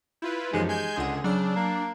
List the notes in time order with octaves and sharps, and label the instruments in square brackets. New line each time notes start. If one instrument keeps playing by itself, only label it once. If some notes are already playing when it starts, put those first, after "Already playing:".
[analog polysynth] E4 F4 B4 [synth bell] G6
[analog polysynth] F#2 F3 [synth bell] E3 D#4 G4 [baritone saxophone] G#3
[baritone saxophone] G#3 [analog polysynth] G#5 G6 G#6
[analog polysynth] C#2 D3 G#4 [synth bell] F#5 C6
[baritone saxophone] C#3 [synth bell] F#3 D5 E6 [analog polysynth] D4
[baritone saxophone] A#3